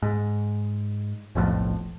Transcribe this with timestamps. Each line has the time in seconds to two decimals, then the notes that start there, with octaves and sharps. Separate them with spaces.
0.02 G#2
1.35 F1 B1 F2 A2